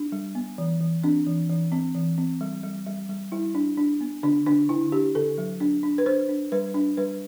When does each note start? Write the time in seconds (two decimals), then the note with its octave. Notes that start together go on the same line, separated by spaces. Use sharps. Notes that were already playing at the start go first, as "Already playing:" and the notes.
Already playing: D4
0.12 G3
0.35 B3
0.58 E3
0.81 E3
1.03 C4 D4
1.26 E3
1.49 E3
1.72 C4
1.95 E3
2.18 C4
2.41 G3
2.63 G3
2.86 G3
3.09 G3
3.32 G3 E4
3.55 D4
3.78 D4
4.01 B3
4.23 D3 D4
4.46 D3 D4
4.69 D3 E4
4.92 D4 G4
5.15 D3 A4
5.38 F#3
5.60 D4
5.83 D4
5.98 B4
6.06 D4 C5
6.29 D4
6.52 G3 B4
6.74 D4
6.97 G3 B4